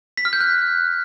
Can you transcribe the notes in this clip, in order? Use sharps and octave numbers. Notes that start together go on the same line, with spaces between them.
B6
F6
G6
F#6